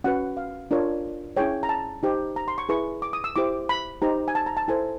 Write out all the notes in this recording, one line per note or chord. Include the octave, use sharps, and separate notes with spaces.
C#4 F#4 B4 F#5
F5
D4 F4 A#4 C#5
C#4 E4 G#4 C#5 G5
A#5
A5
D#4 G4 C5
A#5
C6
C#6
E4 G#4 B4 C#6
D6
D#6
E6
E4 G4 C5 D6
B5
D#4 G4 C5 A#5
G#5
A5
A#5
A5
E4 A4 C5 G#5